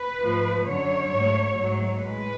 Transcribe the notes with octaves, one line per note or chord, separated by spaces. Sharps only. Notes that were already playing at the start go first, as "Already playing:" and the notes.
Already playing: B4
G#2 F3 A3
F#2 D3 F#3 C#5
G#2 F#3 A3
G#2 F#3 A3
A2 G#3 B4